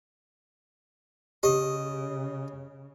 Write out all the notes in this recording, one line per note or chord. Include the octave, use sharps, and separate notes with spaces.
C#3 G4 D#5